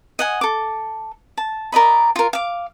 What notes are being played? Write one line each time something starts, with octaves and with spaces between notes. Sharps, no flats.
D#5 F#5 G#5
A4 D6
A5
A#4 D5 D#5 B5
F4 A#4
F5 D6